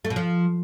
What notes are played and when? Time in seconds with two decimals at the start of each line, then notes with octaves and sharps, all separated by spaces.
0.05 A3
0.10 B2
0.16 F3